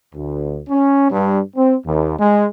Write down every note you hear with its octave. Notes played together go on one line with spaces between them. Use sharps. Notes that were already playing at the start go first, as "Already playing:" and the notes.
D2
C#4
G2
C4
D#2
G#3